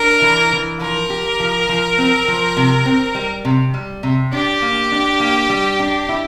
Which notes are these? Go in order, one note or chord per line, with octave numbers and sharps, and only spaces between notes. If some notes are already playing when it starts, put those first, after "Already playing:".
Already playing: D4 A#4
E3
E3
F3 A#4
G4
F3
F3
C4
F3
C3
C4
G3
C3
G3
C3
D4 G4
A#3
D4
A#3
G3
D4
E4